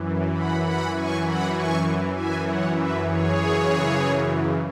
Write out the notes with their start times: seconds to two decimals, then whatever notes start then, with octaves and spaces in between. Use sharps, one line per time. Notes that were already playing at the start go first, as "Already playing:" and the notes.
Already playing: F#2 E3
0.33 F#5 B5
0.63 F#5 B5
0.94 F#2 E3 G#5 C#6
1.24 F#5 B5
1.54 G#5 C#6
2.14 F#2 E3 E5 G#5
2.44 C#5 F#5
2.74 B4 E5
3.04 G#4 C#5
3.34 F#2 C#3 E3